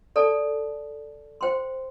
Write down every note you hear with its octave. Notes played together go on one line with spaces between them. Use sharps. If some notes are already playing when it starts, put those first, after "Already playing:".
A4 D5 A5
C5 G5 C6